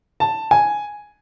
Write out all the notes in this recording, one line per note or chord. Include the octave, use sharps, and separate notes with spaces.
A5
G#5